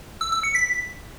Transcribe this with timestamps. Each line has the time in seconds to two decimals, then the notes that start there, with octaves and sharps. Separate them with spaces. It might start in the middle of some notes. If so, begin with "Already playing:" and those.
0.21 E6
0.32 E6
0.43 C#7
0.55 B6